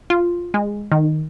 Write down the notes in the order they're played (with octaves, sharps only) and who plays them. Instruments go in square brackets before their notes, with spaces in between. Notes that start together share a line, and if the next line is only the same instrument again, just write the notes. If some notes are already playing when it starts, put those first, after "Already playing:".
[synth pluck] F4
G#3
D#3